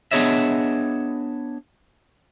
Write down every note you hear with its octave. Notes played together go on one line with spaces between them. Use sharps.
B3 D4 G#4 C#5 D#5 E5